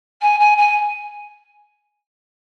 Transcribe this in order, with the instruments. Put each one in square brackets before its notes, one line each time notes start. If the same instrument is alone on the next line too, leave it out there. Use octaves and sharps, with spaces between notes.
[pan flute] G#5
G#5
G#5